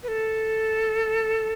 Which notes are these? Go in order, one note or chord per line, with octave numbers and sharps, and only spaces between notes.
B4
A4